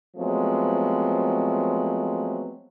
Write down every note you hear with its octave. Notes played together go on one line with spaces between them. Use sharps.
F3 F#3 G#3 A3 B3 C4